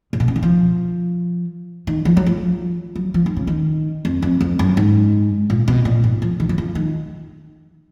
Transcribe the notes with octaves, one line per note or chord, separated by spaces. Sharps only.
A#2
B2
C#3
D#3
F3
D#3
F3
F#3
F3
F#3
F3
D#3
C#3
D#3
F2
F2
F2
F#2
G#2
A#2
B2
A#2
G#2
F3
D#3
F#3
F3
D#3